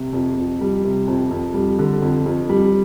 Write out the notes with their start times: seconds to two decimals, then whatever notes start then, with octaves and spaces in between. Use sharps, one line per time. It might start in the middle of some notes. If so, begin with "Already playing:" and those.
Already playing: C3
0.13 F2
0.37 F2
0.61 G3
0.84 C3
1.07 F2
1.31 F2
1.54 G3
1.79 D3
2.02 F2
2.26 F2
2.49 G3